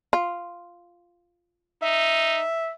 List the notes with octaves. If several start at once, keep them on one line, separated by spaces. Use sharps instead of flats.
F4
D#4 E5